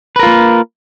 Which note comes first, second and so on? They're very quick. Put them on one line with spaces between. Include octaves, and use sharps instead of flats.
B4 A#4 F4 A#3